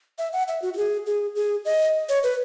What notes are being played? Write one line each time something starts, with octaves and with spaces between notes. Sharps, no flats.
E5
F#5
E5
F#4
F#4
G#4
G#4
G#4
D#5
C#5
B4